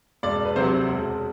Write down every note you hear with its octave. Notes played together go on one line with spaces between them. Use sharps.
E1 D5
B4
D2 C3 F#3 C5
E1